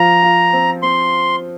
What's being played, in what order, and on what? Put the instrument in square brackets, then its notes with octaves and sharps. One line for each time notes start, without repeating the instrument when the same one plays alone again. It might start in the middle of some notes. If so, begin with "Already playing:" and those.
Already playing: [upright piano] F3 F4 [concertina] A#5
[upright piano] F4
C4
[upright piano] C4 [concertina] C6